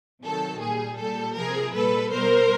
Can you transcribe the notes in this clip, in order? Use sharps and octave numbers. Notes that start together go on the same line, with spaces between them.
C3 D#3 F#3 A4
A#2 G3 G#4
A#2 G3 A4
C3 F3 G#4 A#4
A#2 G3 A4 B4
B2 G3 A#4 C5